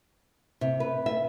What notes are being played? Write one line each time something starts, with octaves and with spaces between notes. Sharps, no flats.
C3
B4
E5